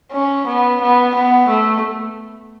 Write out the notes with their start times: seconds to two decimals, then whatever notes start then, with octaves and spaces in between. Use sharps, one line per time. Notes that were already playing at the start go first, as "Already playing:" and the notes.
0.12 C#4
0.47 B3
0.81 B3
1.15 B3
1.49 A3